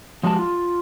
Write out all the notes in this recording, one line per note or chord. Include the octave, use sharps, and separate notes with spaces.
F3 G#3 F#4 G4 A5
F4